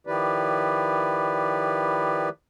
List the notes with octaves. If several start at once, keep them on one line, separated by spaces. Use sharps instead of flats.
D#3 F3 E4 G4 B4 D5